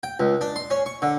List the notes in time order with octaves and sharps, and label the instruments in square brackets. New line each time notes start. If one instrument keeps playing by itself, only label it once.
[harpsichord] G5
C#2
D4
C6
C#4
C#6
D3